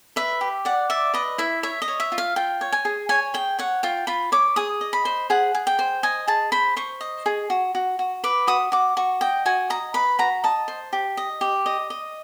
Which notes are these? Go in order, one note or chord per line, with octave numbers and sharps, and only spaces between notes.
B4 E5
G4
D5 F#5
D5 E5
B4 D#5
E4 E5
C#5 E5
D#5
C#5
E5
F4
F5
F4 G5
C#5
G#5
G#4
C#5 G#5
G#4 G5
C#5 F#5
F4 G5
F4 B5
C#5 D6
G#4 D#6
D#5
B5
C5
G#4 F#5
G#4
G5
C5
D#5 G#5
G#4 A5
C5 B5
C5 C#6
D#5
G#4
F#4
F#4
F#4
B4 D6
F#4 D#6
F#4 D6
F#4 C#6
D#5 G5
F#4 G#5
D#5 A#5
B4 B5
F#4 A#5
D#5 A5
C5
G4
D#5
G4
D#5
D#5